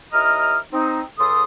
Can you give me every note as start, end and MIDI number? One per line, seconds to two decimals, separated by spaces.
0.13 0.58 39
0.13 0.58 64
0.13 0.58 75
0.13 0.58 82
0.13 0.58 87
0.13 0.58 89
0.73 1.01 60
0.73 1.01 63
1.19 1.43 37
1.19 1.43 49
1.19 1.43 69
1.19 1.43 84
1.19 1.43 87